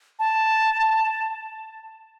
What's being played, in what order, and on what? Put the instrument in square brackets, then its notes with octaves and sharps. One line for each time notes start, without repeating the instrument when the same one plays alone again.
[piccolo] A5